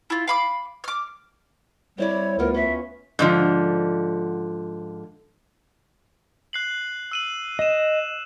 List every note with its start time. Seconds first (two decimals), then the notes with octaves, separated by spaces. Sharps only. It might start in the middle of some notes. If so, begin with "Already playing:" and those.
0.10 E4 F4
0.28 F5 B5 D6
0.84 D6 F6
1.98 G3 C4 E4 C#5 D5
2.39 D2 B3 F4 A#4
2.54 C#4 E5
3.19 G#2 D3 F3
6.53 F#6 C7 F#7
7.11 E6 D#7 F#7
7.59 D#5 D#7 E7